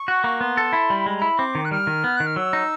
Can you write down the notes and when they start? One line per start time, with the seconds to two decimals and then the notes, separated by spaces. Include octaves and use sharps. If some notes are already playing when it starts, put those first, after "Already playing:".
Already playing: C#6
0.08 F#4
0.24 A#3
0.40 B3 C6
0.57 A4
0.73 E4
0.90 G3
1.06 G#3 B5
1.16 A#5
1.22 E4
1.27 B5
1.38 C4 D6
1.55 D#3
1.65 F#6
1.71 G3 F6
1.87 D#3
2.04 B3
2.16 D#3 F#6
2.26 F6
2.36 F#3 E6
2.53 D#4